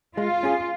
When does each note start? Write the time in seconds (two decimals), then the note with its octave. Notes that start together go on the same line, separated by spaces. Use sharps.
0.17 G#3 F4
0.43 C#4 G#4